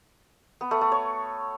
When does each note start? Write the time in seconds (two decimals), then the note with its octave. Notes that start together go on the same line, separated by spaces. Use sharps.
0.61 B3
0.71 A3
0.81 A3
0.92 C#5